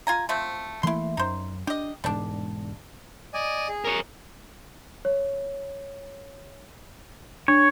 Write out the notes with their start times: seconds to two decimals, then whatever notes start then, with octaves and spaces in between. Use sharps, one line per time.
0.07 F4 G#5 A#5
0.29 F3 A3 C4
0.83 E3 A3 A#3 E4 C6
1.17 F#2 D#4 C5
1.67 D4 G4 D#5
2.04 E1 G#2 G3 D4
3.34 D5 D#5 G#5
3.69 G#4
3.85 A#4 C#5
5.05 C#5
7.48 D4 C#5